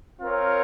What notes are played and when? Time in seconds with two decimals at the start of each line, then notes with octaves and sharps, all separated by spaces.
0.21 C4 F4 A#4 C#5